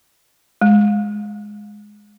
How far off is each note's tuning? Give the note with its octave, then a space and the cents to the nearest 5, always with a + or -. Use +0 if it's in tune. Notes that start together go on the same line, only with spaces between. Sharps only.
G#3 +5